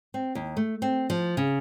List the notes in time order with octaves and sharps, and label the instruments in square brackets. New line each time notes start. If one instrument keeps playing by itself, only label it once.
[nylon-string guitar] C4
D#2
A3
C4
F3
C#3